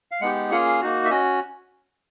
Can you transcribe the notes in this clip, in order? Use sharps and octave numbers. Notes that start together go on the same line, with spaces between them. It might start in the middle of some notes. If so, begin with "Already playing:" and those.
F5
G#3 B3 D#4 G4 F#5
A#3 C#4 F4 G#4 F#5
F5
A#3 D#4 F#4
E5
C#4 F#4 D#5